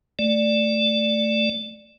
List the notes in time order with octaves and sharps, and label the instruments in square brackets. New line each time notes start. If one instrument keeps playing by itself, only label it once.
[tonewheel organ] A3 D5